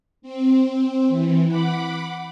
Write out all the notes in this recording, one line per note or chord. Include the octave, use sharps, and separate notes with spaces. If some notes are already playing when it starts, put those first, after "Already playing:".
C4
E3
F#5 B5 D6